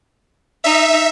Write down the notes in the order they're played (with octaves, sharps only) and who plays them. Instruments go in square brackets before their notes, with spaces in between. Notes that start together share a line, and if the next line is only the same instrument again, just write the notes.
[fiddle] D#4 [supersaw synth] E5